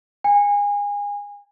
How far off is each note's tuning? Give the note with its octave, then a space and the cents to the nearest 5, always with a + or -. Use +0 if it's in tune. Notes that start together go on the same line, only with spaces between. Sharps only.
G#5 -30